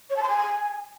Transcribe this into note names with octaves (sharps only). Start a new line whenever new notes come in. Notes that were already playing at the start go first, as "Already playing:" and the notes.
C#5
A5
C6
G#5